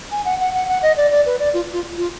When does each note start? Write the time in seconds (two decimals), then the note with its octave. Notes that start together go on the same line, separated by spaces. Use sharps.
0.11 G#5
0.25 F#5
0.40 F#5
0.54 F#5
0.68 F#5
0.82 D#5
0.97 D5
1.11 D5
1.26 B4
1.40 D5
1.54 F4
1.73 F4
1.97 F4